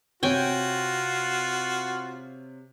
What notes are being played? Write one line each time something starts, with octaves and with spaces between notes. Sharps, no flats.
C3 F4 F#4 C#5 G5 G#5